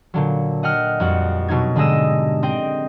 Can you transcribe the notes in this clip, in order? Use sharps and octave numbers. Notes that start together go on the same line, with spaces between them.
A#2 D3 F#3
D#5 F#5 G5 F6 F#6
F2 G3 F#4 F#5
B2 F#3 D#4 G#6
G#2 D3 G#3 G4 D#5 E6
C4 C5 D#5 G5